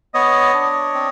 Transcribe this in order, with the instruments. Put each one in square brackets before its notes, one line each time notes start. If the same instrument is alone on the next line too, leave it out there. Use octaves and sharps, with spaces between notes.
[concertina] B3 C#5 D#5
D4
C4